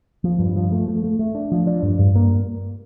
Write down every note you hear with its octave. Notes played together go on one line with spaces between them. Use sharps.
F3
G2
F3
A3
A3
A3
A3
D4
F3
D4
G2
G2
A#3